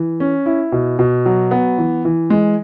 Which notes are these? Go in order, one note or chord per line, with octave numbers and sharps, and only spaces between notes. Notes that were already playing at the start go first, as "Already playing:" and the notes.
Already playing: E3
C#4
E4
B2
B2
F#3
B3
E3
E3
G#3